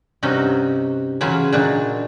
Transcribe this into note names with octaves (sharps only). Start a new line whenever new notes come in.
G2 C3 C#4 D#4 F#4
C#3 E3 F#3 F4 G#5
A#2 F#3 D4 D#4